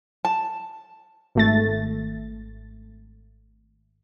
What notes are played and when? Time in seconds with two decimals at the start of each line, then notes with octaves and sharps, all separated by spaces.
0.25 A5
1.35 G#1 A3 A6